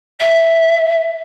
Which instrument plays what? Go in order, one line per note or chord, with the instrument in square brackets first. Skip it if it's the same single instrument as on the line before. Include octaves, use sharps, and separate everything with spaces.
[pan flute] E5